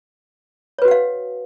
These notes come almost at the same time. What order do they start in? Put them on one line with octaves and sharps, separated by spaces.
C#5 B4 F#4 F#5 F5